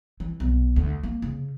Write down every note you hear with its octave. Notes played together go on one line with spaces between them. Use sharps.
E3
B1
D2
A#3
C#3